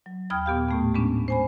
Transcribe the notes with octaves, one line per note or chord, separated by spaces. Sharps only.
F#3
D#2 G5 B5 D#6 F6 G#6
A#2 B3 G4 F5
A2 A3 B3
G#3 B3 C#4 D4
C5 G#5 B5